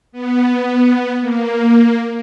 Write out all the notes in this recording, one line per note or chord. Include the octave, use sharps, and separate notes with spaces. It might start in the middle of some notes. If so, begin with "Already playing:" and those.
B3
A#3